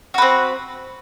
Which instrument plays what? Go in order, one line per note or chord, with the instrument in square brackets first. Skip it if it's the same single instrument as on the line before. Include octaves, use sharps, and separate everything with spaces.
[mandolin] F#4
B4
C4